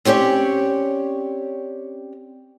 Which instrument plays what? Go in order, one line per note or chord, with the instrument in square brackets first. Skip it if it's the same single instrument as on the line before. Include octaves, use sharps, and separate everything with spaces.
[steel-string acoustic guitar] C4 C#4 G4 C#5 D5